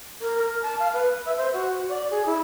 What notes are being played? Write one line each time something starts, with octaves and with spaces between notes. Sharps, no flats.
A#4
A#4
A5
F5
B4
E5
C5
F#4
D5
G#4
E4